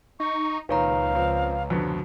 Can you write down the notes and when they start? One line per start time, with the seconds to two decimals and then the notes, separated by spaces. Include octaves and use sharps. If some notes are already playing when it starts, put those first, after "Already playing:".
0.20 D#4 C#6
0.69 C#2 A#2 D#3 B4 C#5 F5 A#5
1.15 F3 C4
1.70 F2 B2 D3